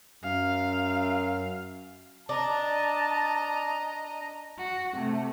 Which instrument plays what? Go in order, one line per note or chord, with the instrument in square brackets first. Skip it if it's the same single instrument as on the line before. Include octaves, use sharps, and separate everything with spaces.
[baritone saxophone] F#2 [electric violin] F5
[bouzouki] D4 [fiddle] D#5 A#5 [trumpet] A5
[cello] F#4
C3 A3